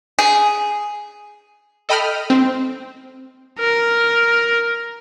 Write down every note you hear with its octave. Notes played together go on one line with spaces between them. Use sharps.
G#4
A4 D#5 G5 B5 D#6 F6
C4
A#4